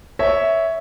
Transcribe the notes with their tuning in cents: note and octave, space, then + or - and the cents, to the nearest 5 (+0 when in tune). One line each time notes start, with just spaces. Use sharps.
C#5 +10 E5 -10